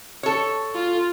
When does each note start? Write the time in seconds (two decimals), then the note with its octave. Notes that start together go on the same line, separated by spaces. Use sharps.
0.23 A4 C#5
0.75 F4